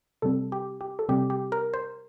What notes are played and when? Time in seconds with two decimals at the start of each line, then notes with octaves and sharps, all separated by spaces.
0.22 C3 G3 C4 A4
0.52 G4
0.81 G4
0.99 A4
1.09 C3 G3 C4 G4
1.30 G4
1.52 A#4
1.74 C5